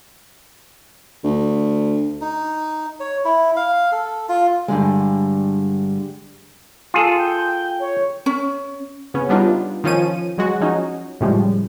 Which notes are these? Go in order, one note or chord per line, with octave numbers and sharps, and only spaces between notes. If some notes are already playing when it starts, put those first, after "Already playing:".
D2
D#4
C#5
E4
F5
A4
F4
G2 D3 G3 G#3
F4 G#4 A4
G5
C#5
C#4
C#3 B3 C#4
G3 B3 D4 D#4 F4
D#3 F3 C#4 D#7
F#3 G#3 F#4
F3 C#4 D#4 F#4
A2 C#3 F3 G3 G#3